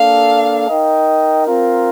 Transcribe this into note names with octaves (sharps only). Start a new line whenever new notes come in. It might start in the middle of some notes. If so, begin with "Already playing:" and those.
Already playing: A#3 D4 A4 F5
D#4 A#4 D#5 G5
C4 F4 A#4